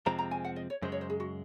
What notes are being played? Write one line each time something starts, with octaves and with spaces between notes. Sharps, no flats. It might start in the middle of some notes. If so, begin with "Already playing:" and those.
F2 C3 F3 G#3 C4 A#5
A#5
G#5
F#5
D#5
C#5
F#2 C#3 G#3 C5
C#5
C5
G#4
F#4